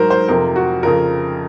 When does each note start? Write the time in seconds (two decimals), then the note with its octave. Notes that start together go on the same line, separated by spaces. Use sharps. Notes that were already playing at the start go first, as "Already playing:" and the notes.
Already playing: G#2 F#3 A#4 C5
0.10 C5
0.28 F2 C3 F3 A#4
0.56 F#4
0.83 F2 C#3 F3 A#4